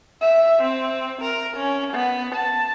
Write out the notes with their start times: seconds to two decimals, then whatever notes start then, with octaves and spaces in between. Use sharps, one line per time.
0.21 E5
0.62 C4
1.22 A#4
1.57 C#4
1.93 B3
2.35 A5